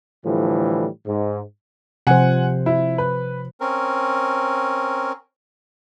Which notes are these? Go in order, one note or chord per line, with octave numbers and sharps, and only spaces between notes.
A2 D3 E3 F3 G3
G#2
C3 F3 C5 F#5 G#5
E4
B4
C4 C#4 A#4